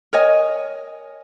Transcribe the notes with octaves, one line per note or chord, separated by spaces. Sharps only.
A#4 C#5 D#5 G#5